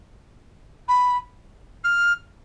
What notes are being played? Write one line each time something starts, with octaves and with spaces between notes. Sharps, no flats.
B5
F6